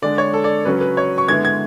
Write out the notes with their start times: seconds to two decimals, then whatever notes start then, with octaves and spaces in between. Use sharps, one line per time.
0.02 D3 G#3 D4 D5
0.18 C#5
0.34 A4
0.44 D5
0.65 C#3 F#3 C#4 B4
0.81 B4
0.97 C#5
1.18 C#6
1.28 D3 G#3 B3 E4 G#6
1.45 G#6